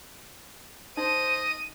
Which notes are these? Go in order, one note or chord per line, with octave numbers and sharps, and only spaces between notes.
D#4 C5 D#5 D#7